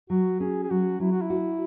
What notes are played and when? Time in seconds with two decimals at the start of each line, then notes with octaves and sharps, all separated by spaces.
0.10 F#3 F#4
0.40 C#4 G#4
0.63 G#4
0.70 F#3 F#4
1.00 F#3 E4
1.12 F#4
1.22 E4
1.30 F#4